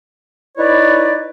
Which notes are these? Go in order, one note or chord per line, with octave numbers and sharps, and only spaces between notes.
D#4 E4 B4 C#5 D5